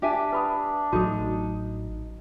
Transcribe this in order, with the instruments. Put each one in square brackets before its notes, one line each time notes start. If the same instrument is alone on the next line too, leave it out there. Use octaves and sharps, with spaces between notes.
[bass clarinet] D4 [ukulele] G4 E5 G#5
[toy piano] B4 B5 D#6
[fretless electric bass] A1 F#3 [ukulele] D#4 [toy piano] F#4 A4 D#6